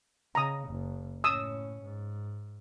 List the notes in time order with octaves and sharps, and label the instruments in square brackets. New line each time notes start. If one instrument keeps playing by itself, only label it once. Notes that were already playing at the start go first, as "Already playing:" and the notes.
[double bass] C#3 [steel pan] A#5 D#6
[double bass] F#1
[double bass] A2 C#4 [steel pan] D#6 E6
[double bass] G#2